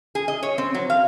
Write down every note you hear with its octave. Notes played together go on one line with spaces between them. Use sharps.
G#4
D#5
C#5
C4
F#3
F5